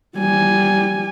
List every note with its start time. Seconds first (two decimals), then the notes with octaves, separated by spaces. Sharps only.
0.17 G3 G#5